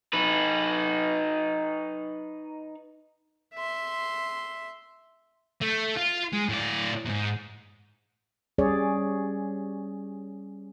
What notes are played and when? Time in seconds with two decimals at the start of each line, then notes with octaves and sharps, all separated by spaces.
0.13 D#4 B4
3.55 E5 C6
5.61 A3
5.97 F4
6.33 G#3
6.49 A2 D5
7.05 E2 G#2
8.58 G3 C#4 G#4 C#5 D5